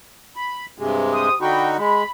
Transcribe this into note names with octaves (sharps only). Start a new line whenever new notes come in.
B5
G2 C3 G#3
G4 C5 D#6
D3 D#4 F#4 D#5 G5 B5
G#3 B5